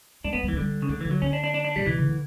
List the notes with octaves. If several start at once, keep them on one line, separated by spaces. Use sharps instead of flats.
G3 D4
A3 B3
G3
E3
A3
D3 G3
C#3
D3 A3
D3 E3
F#3
D3 C#4
D4
D4
D4
D4
A2 G3
B2 E3
C#3
D3